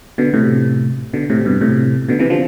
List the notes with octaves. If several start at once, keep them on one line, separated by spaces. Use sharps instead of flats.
B2 D3
A2 C3
B2 D3
A2 C3
G2 B2
A2 C3
B2 D3
C3 E3
D3 F3